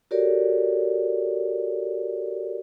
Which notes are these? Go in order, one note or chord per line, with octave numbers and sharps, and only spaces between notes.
F#4 G4 A4 A#4 C#5 D5